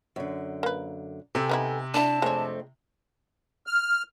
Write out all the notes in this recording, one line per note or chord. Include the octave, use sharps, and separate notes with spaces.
F#2 D3
A#3 B4
C3 A4 G5 G#5
B3 D#4 E4
D4 E4 D5 A5
F2 G#3 A3 C4 C#5
F6